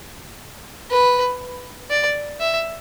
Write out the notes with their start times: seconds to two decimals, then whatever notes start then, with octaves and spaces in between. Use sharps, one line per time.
0.91 B4
1.91 D5
2.40 E5